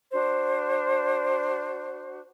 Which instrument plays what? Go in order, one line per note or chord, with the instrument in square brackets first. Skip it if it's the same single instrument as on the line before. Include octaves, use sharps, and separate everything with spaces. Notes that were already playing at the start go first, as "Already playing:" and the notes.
[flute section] D4 F#4 C5